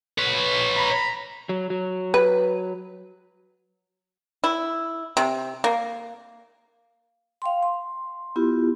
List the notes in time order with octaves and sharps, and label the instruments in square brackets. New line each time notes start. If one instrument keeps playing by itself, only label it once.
[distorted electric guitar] B4 C#5
[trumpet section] A#5 B5
[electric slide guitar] F#3
F#3
[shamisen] B4
[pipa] E4
C3
A#3
[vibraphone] F5 G5 C6
C6
B3 E4 F4 G4